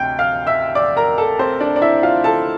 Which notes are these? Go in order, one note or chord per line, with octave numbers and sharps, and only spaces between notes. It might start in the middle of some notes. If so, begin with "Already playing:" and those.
Already playing: D2 C3 G5 G6
F5 F6
E5 E6
D5 D6
A#4 A#5
A4 A5
C4 C5
D4 D5
D5
E4 E5
F4 F5
A4 A5